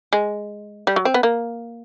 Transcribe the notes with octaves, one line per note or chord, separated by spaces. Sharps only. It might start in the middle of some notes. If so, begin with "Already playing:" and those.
G#3
G3
F#3
C4
B3
A#3